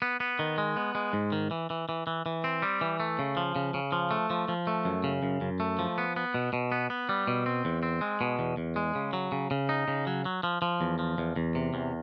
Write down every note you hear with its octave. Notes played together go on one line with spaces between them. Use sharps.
B3
B3
D#3
G#3
B3
G#3
G#2
D#3
E3
E3
E3
E3
E3
C4
G3
E3
A3
C#3
F3
C#3
C#3
F3
A3
F3
F3
A3
F#2
C#3
F#2
F#2
A3
F3
B3
B3
B2
B2
B3
B3
G3
B2
C4
E2
C4
G#3
B2
E2
E2
G#3
C#3
F#3
C#3
C#3
D#4
C#3
F#3
F#3
F3
F3
E2
F3
E2
E2
C3
E2